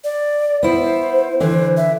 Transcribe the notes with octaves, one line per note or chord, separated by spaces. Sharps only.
D5
B3 E4 C5
D3 E3 C5
E5